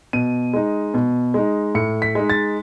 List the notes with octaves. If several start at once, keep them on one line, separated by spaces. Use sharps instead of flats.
B2 D#7
G#3 D#4
B2
G#3 D#4
A2 C#7
B6
G#3 D#4
A6